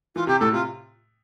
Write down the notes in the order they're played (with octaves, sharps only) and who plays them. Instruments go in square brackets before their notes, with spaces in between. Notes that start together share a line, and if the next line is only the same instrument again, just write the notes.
[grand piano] E3 [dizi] F4
[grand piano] C3 [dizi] G4
[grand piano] A2 [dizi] A4
[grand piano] C3 [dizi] F4